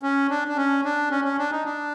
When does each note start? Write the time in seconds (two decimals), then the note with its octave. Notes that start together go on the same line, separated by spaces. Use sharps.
0.03 C#4
0.30 D4
0.48 D4
0.57 C#4
0.85 D4
1.11 C#4
1.24 C#4
1.39 D4
1.52 D#4
1.65 D4